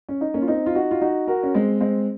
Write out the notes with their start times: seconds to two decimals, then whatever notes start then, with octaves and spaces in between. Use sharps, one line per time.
0.09 C#4
0.21 D#4
0.34 A#3 C#4
0.42 F4
0.48 C4 D#4
0.66 F4
0.75 D#4 F#4
0.91 F4
1.01 D#4 F#4
1.27 F#4 A#4
1.43 C#4
1.54 G#3 C4
1.81 G#3 C4